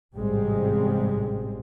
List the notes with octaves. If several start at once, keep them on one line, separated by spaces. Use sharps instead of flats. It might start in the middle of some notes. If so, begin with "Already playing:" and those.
A1 G#2 C3 G3 G#3 C4